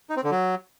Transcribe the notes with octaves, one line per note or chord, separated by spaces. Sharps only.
D#4
C4
D3
F#3